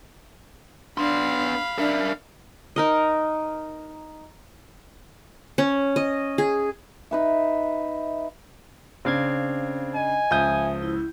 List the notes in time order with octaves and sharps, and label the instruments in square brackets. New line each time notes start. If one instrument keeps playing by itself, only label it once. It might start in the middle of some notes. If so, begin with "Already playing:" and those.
[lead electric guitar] B3 C6 [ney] D4 [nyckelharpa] F5 B5
[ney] D4 [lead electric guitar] A#4 E5
[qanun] D#4 A#4 D#5
C#4
D#5
G#4
[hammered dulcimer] D#4 B4 E5
[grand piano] C#3 D4 [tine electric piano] C4 F5 G#6
[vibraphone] D#5 [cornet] G#5
[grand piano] C#2 G6 [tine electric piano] F3 D#6 [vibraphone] E5
[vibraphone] E4